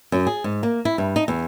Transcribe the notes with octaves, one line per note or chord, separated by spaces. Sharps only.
F#2
G#4
G#2
A#3
E4
G2
D#4
E2